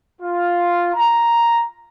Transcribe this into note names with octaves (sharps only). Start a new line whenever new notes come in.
F4
A#5